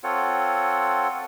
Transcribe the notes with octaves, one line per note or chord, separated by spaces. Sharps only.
C4 F4 A4 C#5 F#5